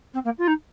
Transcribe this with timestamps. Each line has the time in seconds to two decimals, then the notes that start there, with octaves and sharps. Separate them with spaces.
0.14 C4
0.25 A#3
0.38 F4
0.48 D#4